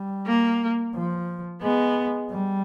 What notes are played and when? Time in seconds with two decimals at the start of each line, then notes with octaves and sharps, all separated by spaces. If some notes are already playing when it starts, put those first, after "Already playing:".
Already playing: G3
0.27 A#3
0.95 F3
1.62 G#3 B3
2.30 G3